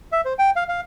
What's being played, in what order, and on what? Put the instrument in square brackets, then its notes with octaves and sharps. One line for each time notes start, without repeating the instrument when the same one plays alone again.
[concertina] E5
C5
G5
F5
F5